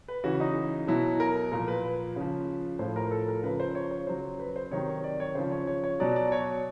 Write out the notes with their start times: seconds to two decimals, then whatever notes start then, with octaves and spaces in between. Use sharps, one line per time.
0.08 B4
0.24 C#3 E3 F#4
0.40 D#4
0.87 B2 F#3 E4
1.20 A#4
1.52 A#2 F3 A#4
1.68 B4
1.84 B4
2.16 C#3 F3
2.79 A2 F3 C5
2.96 A#4
3.11 A4
3.28 A#4
3.43 C#3 F3 B4
3.60 C5
3.75 C#5
3.91 C#5
4.07 C#3 F#3 C5
4.40 B4
4.56 C5
4.71 C3 D#3 F#3 C#5
4.88 C#5
5.04 D5
5.20 C#5
5.35 C#3 F3 C5
5.51 C#5
5.67 C#5
5.84 C#5
6.00 B2 F#3 D5
6.16 D5
6.32 C#5